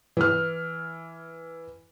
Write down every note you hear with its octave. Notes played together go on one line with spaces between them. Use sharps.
E3 F6